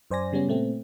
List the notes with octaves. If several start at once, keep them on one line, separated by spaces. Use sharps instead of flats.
F#2 C5 D5 G#5 A#6
C#3 G3 B3 C#4
A#2 A3 C4